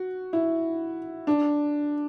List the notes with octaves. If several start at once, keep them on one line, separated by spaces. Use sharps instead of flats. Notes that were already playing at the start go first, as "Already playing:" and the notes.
Already playing: F#4
E4
D4